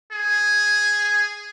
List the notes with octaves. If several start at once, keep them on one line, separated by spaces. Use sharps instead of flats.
G#4